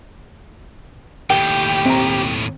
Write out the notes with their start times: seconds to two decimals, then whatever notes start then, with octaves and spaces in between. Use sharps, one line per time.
1.30 D#2 A2 G4 G5
1.86 C4 A#5